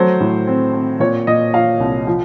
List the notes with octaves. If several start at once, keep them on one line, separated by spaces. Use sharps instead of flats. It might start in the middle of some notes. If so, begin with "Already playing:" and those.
Already playing: F#3 A3 C5
A2
C4
C4
A#2 C#5
A#2 D#5
F3 F5
C2
F3